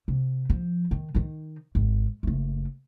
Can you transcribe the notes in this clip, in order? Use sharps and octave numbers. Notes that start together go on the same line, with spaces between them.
C3
F3
D#3
D#3 D#4
G#1
F#1 A3